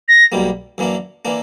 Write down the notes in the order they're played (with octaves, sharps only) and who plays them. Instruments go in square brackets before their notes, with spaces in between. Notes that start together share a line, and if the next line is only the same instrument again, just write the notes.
[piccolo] A#6
[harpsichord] B1 B2 G3 A#3
F#2 E3 A#3 D4
E3 A#3 D4